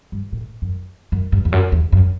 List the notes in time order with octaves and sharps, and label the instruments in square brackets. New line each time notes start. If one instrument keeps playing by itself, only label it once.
[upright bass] G2
A2
F#2
F#2
G2
E2
F#2
E2
F#2